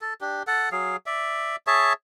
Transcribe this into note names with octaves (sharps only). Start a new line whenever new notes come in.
A4
D4 G4
A4 F#5
F#3 G#4 F5
D5 E5
G#4 C#5 E5 A5